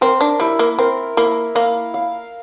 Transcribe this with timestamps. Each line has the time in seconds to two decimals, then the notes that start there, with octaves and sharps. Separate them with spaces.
0.01 C4 A#4
0.21 D4
0.40 G3 E4
0.59 A#3
0.78 C4 A#4
1.17 A#3 E4
1.55 A#3 F5
1.94 F5